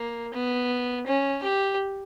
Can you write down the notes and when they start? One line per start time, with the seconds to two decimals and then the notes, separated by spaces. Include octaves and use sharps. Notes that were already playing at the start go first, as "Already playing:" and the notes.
Already playing: A#3
0.34 B3
1.06 C#4
1.43 G4